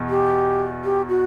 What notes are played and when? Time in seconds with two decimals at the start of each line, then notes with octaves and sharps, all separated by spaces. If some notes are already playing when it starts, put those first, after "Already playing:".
Already playing: E2 B2
0.09 G4
0.84 G4
1.09 F#4